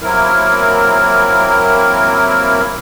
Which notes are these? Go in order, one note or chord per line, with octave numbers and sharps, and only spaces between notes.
F#3 A#3 C4 E4 A#4